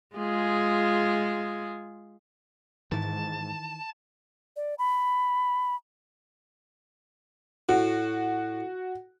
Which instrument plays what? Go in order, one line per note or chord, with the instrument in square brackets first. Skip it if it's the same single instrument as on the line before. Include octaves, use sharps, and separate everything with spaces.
[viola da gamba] G#3 F4 G#4
[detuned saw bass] G#2 [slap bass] D#3 E3 [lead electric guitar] A5
[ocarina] D5
B5
[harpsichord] A2 [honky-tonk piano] F#4